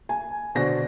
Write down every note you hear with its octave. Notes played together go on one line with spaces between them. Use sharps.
G#5
B2 D3 F#4 C5 D5 A#6